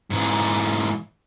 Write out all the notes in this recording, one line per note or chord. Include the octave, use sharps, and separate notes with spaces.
G#2 E3